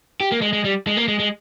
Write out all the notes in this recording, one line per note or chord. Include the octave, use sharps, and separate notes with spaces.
G4
A#3
G#3
G#3
G3
G#3
A#3
G#3
G#3